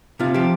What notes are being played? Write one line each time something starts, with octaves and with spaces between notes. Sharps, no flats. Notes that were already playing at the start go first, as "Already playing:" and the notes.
C3 F4
F3 G4